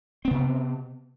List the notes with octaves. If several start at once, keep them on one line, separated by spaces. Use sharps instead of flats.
C3 B3 C4